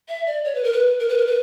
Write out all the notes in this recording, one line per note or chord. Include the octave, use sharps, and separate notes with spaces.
E5
D5
C#5
B4
A#4
B4
A#4
B4
A#4
B4